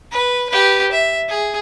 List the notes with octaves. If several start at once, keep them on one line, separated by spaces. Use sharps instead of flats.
B4
G4 B4
E5
G#4